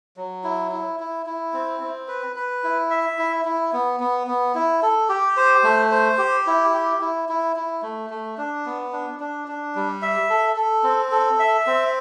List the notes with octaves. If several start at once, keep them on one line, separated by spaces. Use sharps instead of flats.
F#3
E4
E4
E4
E4
C4
C4
B4
B4
E4
E5
E4
E4
B3
B3
B3
E4
A4
G4
C5
A3
C5
G4
E4
G4
E4
E4
E4
A3
A3
D4
B3
D4
D4
D4
G3
E5
A4
A4
C4
A4
E5
C4